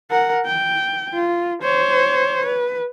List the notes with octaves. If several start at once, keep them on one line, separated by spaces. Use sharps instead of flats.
A#4 F#5
G5
F4
C5 C#5
B4